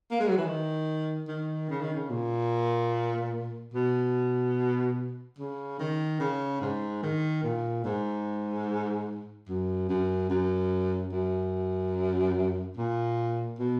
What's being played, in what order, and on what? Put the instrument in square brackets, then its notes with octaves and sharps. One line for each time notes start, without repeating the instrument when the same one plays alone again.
[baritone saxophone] A#3
G#3
F#3
E3
D#3
D#3
C#3
D#3
C#3
A#2
B2
C#3
D#3
C#3
G#2
D#3
A#2
G#2
F#2
F#2
F#2
F#2
A#2
B2